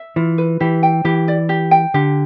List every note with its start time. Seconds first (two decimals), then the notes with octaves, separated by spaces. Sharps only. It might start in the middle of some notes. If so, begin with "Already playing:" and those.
Already playing: E5
0.16 E3 F4
0.38 B4
0.60 E3 G4
0.83 G5
1.05 E3 G4
1.28 D5
1.49 G4
1.71 G5
1.94 D3 G4